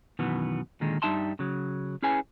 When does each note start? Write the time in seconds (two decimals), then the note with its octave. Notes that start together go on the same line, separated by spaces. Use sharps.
0.19 F#2 B2 D#3 E3 B3
0.81 A#2 D3 D#3 G#3
1.02 G2 G3 D#4 E5 A5 C6
1.39 C#3 F#3
2.03 C#4 E4 G#4 B4 C#5 G#5